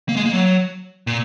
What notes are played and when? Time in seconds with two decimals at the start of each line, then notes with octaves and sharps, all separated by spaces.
0.09 A#3
0.17 G#3
0.26 A#3
0.33 F#3
1.07 A#2